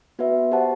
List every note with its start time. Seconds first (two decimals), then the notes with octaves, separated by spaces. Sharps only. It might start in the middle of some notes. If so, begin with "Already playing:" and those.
0.19 B3 F#4 B4 E5
0.52 G4 C5 F#5 A5